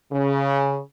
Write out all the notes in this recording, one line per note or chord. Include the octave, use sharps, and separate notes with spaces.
C#3